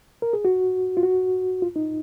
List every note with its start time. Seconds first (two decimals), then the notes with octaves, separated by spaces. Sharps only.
0.22 A#4
0.33 G#4
0.45 F#4
0.97 F4
1.03 F#4
1.62 F4
1.76 D#4